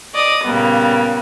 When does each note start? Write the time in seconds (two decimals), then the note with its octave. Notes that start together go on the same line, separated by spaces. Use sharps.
0.14 D5 D#5 D#6
0.45 A#2 C#3 G3 A#3 B3